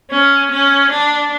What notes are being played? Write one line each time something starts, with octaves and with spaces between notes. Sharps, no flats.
C#4
C#4
D4